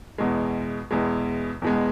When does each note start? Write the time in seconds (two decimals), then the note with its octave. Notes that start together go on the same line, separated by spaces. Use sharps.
0.18 E2 B2 G#3
0.91 E2 B2 G#3
1.62 E2 B2 G#3